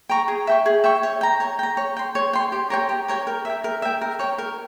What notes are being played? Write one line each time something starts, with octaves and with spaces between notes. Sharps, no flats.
G5 A#5 C#6
G#4
E5 G5 C#6
G#4
E5 G5 C#6
C#5
G5 A#5
C#5
G5 A#5
C#5
G5 C6
C#5
G5 C6
G4
A#4 C#5 G5
G4
A#4 C#5 G5
A#4
E5 G5
A#4
E5 G5
A#4
C#5 G5
A#4